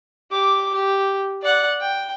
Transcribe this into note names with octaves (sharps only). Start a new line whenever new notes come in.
G4 D6
G4
D5 F#5
G5